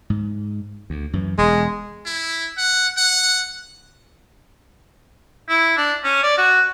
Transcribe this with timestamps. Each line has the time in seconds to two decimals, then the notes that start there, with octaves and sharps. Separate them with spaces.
0.10 G#2
0.90 D2
1.13 F#2 E3
1.38 E1 G#3
2.06 E4
2.58 F#5
2.97 F#5
5.48 E4
5.77 D4
6.04 C#4
6.23 D5
6.38 F#4